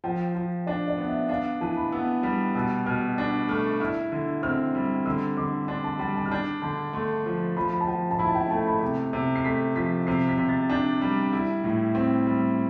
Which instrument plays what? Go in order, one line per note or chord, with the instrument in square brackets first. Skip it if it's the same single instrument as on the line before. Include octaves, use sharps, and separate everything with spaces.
[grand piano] F3 [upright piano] G5
[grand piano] F3
[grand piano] D4 [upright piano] D5
[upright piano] D5
[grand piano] B3
[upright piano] E5
[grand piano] D4 [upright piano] F5
[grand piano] E3 [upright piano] A5
[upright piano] B5
[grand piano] B3 [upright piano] E6
[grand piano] G3
[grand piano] B2 [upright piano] E6
[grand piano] B2 [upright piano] F6
[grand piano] D4
[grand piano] A3 [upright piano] F6
[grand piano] E4 [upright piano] F6
[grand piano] D3
[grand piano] C4 [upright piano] F6
[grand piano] G3
[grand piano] D3 [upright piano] E6
[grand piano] D3 [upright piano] D6
[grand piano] D4 [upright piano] C6
[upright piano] A5
[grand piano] G3 [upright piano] G5
[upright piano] A5
F6
[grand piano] D4 [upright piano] G6
[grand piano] D3 [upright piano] A5
[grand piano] A3 [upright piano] C6
[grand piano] F3
[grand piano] F3 [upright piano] B5
[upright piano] B5
A5
[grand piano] F3 [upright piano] G5
[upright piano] A5
[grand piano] E4 [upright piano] B5
[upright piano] A5
G5
[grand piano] A3 [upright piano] A5
[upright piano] B5
[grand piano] C3
C3
[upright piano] C7
[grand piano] A3 [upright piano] B6
[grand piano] F3 [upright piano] B6
[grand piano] C3 [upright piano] C7
[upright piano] B6
[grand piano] C3
[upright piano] A6
[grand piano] D4 [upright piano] G6
[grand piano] G3 [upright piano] G6
[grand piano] E4
A2
C4
G3